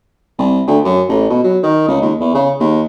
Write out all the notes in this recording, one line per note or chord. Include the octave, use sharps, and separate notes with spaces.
C2
D2
F#2
A1
B2
F#3
D#3
C#2
D#2
E2
C#3
D#2